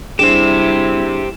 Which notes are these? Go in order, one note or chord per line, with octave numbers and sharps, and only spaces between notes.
G3 D4 E4 G4 G#4 C5 E7